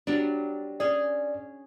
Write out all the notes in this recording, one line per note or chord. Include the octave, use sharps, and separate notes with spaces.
F#3 G3 D4
C#4 G#4 D5